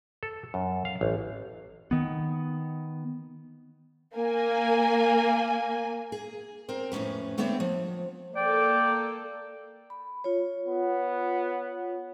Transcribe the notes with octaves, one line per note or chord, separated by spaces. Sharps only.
A4
F#2
F5
A1
D#3 B3
A#3 G#5
G#4
C4 A#4 C5
F2 A2 E3 C#4 B4
D3 A3 B3 C4 C#5 D5
F3
A#3 A4 D5 G5
B5
F4 C#5
B3